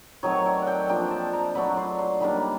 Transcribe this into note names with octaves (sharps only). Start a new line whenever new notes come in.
D#3 F#3 A3 C4 C#5
D5
F#5
G5
F3 A#3 D4 G5
A5
A#5
F#3 A3 D4 B5
C6
C6
D#3 G3 A#3 D4 B5